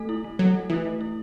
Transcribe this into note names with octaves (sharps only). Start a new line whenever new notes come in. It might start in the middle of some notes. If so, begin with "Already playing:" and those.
Already playing: A3 A4
E4
A3
F#3 A4
A3
E3 E4
A3
E4